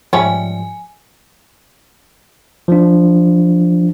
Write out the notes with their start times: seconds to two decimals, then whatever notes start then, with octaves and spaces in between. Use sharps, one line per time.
0.13 G#2 F3 G3 A3 C#4 G#5
2.68 F3 D4